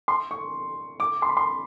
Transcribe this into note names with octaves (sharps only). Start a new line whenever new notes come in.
C6
C#6
D6
C6
B5
C6